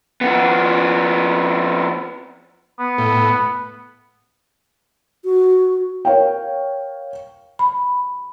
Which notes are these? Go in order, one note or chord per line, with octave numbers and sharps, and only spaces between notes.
F2 B3
B3
A2
F#4
A#4 C#5 F5 G5
B5